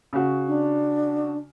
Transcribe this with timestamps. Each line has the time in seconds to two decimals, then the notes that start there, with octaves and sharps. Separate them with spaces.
0.13 C#3 F#4
0.48 D4